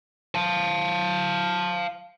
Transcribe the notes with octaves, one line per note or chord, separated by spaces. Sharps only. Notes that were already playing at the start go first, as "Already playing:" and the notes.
F5 A5